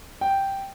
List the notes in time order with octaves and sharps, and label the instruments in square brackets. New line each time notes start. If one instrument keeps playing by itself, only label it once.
[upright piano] G5